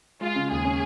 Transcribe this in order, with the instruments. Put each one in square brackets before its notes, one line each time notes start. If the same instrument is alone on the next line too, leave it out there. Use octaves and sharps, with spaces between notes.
[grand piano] G#3 [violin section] F4
[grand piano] C#3
[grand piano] D#2 [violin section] G#4
[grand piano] C#4